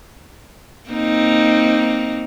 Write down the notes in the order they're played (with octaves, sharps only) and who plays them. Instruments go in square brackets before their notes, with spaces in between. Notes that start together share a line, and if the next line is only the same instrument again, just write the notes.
[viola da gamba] A#3 C4 D#4